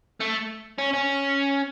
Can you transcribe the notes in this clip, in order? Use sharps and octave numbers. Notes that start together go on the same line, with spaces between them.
A3
C#4
C#4